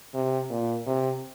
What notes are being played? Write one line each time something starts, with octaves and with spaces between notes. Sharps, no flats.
C3
A#2
C3